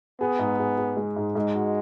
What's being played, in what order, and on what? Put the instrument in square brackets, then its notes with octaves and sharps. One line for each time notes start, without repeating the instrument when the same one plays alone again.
[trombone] B3 [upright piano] G#4
[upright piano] G#2
G#4
G#4
G#3
G#2
[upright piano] G#2 [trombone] G#3
[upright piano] F#4